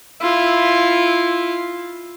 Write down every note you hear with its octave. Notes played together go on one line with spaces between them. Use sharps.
E4 F4